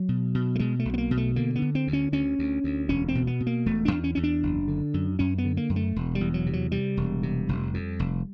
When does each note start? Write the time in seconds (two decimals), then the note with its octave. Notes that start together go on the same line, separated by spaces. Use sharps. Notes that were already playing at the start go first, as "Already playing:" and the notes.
Already playing: F#3
0.09 B2
0.34 B2
0.55 A3
0.59 B2 G#3
0.80 A3
0.85 B1
0.94 B3
0.98 A#3
1.11 B2
1.17 A3
1.36 D3 A#3
1.56 B3
1.62 D3
1.75 C4
1.87 D2
1.93 C#4
2.12 D2 C#4
2.39 D2
2.64 D2
2.89 E1 C#4
3.08 C4
3.15 B2
3.27 B3
3.40 B2
3.47 A#3
3.66 E1 A3
3.85 D4
3.92 E2
4.04 C#4
4.15 E2 C#4
4.23 D4
4.43 F#1
4.68 D3
4.94 F#2
5.19 F#2 C#4
5.38 B3
5.45 D3
5.57 A#3
5.69 F#2
5.76 A3
5.96 E1
6.15 G3
6.21 E2
6.34 F#3
6.46 C3
6.53 F#3
6.72 C3 G3
6.97 E1
7.23 C3
7.49 F1
7.74 F2
7.99 F1